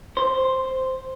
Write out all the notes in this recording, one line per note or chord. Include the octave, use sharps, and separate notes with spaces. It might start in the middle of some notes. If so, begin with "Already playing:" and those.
C5